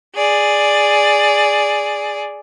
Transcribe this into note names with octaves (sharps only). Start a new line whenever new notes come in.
G#4 D5